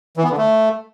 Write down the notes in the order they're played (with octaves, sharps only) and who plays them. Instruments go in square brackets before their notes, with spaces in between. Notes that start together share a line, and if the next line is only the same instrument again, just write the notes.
[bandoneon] E3
B3
D3
A3